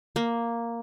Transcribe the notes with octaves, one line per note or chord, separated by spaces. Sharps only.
A#3